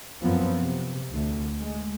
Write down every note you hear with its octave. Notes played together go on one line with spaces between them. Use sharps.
F#2 F3 B3 C4
C3
D2
G#3